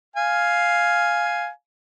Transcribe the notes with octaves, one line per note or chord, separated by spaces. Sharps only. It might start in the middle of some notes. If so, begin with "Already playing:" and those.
F5 G#5